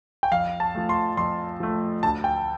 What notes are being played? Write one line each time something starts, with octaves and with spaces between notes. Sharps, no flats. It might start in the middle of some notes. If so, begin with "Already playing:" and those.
G5
F2 F5
A5
F3 A3
C6
F2 C6
F3 A3
D2 A5
G5